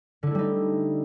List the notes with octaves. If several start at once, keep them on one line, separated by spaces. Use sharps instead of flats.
D3 G3 A3 D#4 E4